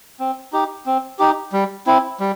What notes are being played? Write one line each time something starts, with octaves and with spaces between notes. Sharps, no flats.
C4
D#4 G4
C4
D#4 G4
G3
C4 E4
G3